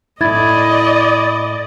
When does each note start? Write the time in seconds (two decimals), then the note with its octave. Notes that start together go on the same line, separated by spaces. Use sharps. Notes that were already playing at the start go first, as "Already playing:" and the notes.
0.21 A2 E4 D5 D#5 B5 G#6 A6